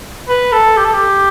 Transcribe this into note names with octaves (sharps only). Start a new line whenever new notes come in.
B4
A4
G4
A4
G4